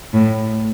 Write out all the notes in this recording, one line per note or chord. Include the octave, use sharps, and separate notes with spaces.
A2